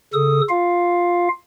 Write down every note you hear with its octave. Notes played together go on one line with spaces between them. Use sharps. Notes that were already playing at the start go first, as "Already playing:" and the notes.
C#3 A4 D#6
F4 F5